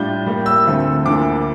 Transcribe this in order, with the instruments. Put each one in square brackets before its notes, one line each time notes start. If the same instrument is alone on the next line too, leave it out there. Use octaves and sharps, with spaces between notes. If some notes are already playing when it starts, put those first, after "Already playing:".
Already playing: [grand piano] A2 G3 D4 F4 G6
A2 G3 A#3
E6
D2 D3 A3 C4 F4
D2 D3 F3 A#3 E4 D6